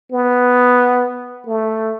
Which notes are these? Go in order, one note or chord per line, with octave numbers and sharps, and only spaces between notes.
B3
A3